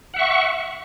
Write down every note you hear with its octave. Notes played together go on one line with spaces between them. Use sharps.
E5 F#5 C#6